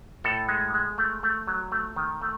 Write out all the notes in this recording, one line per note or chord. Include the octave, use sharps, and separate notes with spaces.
A2 A4
G#3
G#3
A3
A3
F#3
A3
D#3
A3